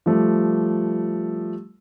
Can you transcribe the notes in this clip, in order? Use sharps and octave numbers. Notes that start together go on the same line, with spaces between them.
F3 G3 A3